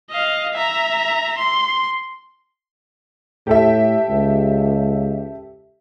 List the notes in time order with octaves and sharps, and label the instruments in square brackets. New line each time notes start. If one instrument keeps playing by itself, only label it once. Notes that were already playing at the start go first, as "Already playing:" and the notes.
[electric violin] D#5 F5
E5 A#5
C6
[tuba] A2 [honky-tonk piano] G4 A4 E5
[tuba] C#2